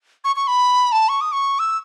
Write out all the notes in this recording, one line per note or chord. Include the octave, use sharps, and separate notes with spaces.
C#6
C#6
B5
A5
C#6
D#6
C#6
E6